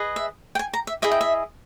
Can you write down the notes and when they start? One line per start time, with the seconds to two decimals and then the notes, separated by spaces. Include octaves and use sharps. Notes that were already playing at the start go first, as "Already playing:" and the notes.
Already playing: G#4 B4 D#5
0.16 E5
0.55 G5
0.59 G#5
0.73 A#5
0.87 E5
1.02 E4 G#4 D#5 E5
1.11 G5
1.21 E5